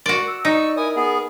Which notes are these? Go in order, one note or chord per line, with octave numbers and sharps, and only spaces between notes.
F#4 A#4 D5
E6
D#4 D5 C#6 E6
E4 A#4 G#5 D#6
B3 G#4